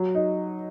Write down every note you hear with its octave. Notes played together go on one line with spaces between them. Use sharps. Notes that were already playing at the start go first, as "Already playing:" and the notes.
Already playing: F#3
D#4